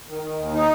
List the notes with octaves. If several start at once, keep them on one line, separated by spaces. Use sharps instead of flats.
D#3
D#3
D#2
D#4